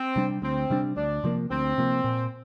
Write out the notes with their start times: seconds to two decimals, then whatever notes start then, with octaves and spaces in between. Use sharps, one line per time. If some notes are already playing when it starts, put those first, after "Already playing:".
Already playing: C4
0.16 C3 G3 D4
0.42 D2 C4
0.70 C3 G3 D4
0.97 D2 D4
1.24 C3 F3 A#3
1.51 D2 C4
1.78 C3 F3 A#3
2.04 A#2